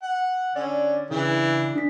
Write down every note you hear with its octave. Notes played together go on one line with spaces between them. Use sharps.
F#5
D3 C#4 D5
C#3 E3 D4
D4 B6